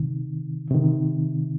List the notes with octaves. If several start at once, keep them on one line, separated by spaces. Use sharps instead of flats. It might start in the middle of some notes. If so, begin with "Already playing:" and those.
Already playing: C3 D#3
C3 D#3